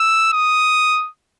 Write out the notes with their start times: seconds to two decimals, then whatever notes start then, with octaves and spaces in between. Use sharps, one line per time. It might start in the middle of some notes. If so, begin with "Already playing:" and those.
Already playing: E6
0.33 D#6